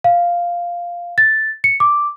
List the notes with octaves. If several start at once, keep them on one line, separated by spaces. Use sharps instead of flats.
F5
A6
C#7
D6